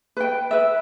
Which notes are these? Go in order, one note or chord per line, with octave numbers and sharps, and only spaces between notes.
B4 G5
B4 E5